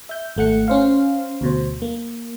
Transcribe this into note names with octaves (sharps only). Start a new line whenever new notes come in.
E5 G6
G#1 A3 F#5 C#7
C#4 C5 F5
D2 B2 C5
A#3